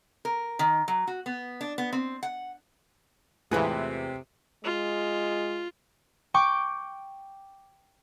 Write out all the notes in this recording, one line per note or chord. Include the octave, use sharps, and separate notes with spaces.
A#4
D#3
F#3
F#4
B3
D4
B3
C4
F#5
E2 A2 C3 E3 G#3 F4 G#4 B4
G#3 F4
G5 C#6 D6